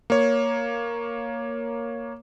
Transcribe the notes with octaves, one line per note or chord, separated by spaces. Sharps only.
A#3 C#5